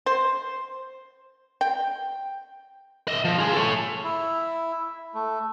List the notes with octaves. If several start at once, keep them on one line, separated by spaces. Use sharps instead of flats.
C5
G5
D#5 E5
F3
F4 G#4
A4 C#5
E4
A3